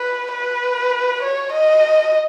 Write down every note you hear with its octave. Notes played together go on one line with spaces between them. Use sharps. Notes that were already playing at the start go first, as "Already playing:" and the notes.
Already playing: B4
B4
C#5
D#5